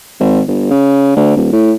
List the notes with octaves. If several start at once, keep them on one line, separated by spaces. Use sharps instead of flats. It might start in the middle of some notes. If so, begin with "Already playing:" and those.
G#1
G1
C#3
D2
D#1
A2